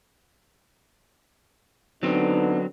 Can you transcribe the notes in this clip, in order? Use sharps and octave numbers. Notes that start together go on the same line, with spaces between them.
D3 F#3 B3 C4 D#4